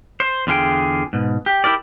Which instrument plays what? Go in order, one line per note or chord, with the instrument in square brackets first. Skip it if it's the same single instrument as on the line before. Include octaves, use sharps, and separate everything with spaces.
[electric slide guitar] C5
E2 D3 F4 G#4 G5
G#2 B2
G4
E4 G4 A#4 D5